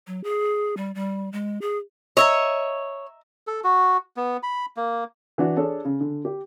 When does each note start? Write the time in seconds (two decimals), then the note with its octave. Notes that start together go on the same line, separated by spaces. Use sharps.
0.07 F#3
0.24 G#4
0.77 G3
0.95 G3
1.32 G#3
1.61 G#4
2.17 C#5 D#5 E5 A#5
3.47 A4
3.64 F#4
4.17 B3
4.43 B5
4.77 A#3
5.38 E3 D4 F#4
5.57 D4 G#4 A4 C#5
5.85 C#3
6.01 D3
6.25 G4